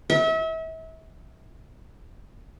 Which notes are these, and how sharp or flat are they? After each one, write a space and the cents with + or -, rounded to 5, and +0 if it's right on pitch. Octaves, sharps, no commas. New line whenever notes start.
E5 -35